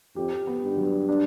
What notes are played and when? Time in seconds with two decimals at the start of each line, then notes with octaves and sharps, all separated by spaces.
0.16 F2 G4
0.47 B3
0.63 G2
0.77 F#3
1.09 D4